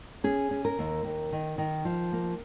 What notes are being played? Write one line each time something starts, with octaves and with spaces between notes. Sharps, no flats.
C#4 G#4
C#4
A#4
D#2
D#2
D#3
D#3
F3
A#3